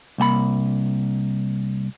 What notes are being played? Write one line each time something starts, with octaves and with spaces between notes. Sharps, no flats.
C2 A#3 G5 B5